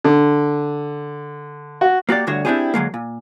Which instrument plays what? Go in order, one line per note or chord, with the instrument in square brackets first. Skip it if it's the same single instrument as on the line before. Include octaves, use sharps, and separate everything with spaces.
[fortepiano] D3
F#4
[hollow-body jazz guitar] A#3 F#4 G4 D5
D2 G2 D3 F#4 C#5
C4 D4 E4 F4 G4 G#4
D3 F#3 G#3 A#3
A#2